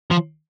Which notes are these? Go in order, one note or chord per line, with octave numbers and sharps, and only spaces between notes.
F3